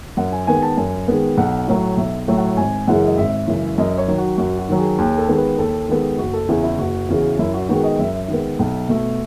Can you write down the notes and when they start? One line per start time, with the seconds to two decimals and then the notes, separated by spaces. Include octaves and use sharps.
0.17 F#2 F#5
0.32 G#5
0.47 D#3 G#3 B3 G#5
0.62 A5
0.77 F#2 G#5
1.08 D#3 G#3 B3
1.37 B1 F#5
1.68 A2 F#3 A3
1.97 B1 E5
2.28 A2 F#3 A3
2.37 F#5
2.57 G#1 G#5
2.88 F#2 C#3 E3 G#3 F#5
3.06 D#5
3.18 G#1 E5
3.48 F#2 C#3 E3 G#3
3.78 F#2 D#5
3.98 C#5
4.08 D#3 F#3
4.18 F#4
4.38 F#2 F#4
4.58 F#4
4.69 D#3 F#3
4.78 G#4
4.98 D#2 G#4
5.18 A4
5.28 D#3 G#3 B3
5.38 B4
5.58 D#2 A4
5.89 D#3 G#3 B3
6.18 F#1 F#4
6.33 A4
6.49 E2 C#3 E3 G#4
6.63 E4
6.78 F#1 F#4
7.09 E2 C#3 E3
7.39 F#2 E4
7.54 F#4
7.69 D#3 G#3 B3 F#4
7.84 D#5
7.99 F#2 E5
8.28 D#3 G#3 B3
8.59 B1
8.89 B2 A3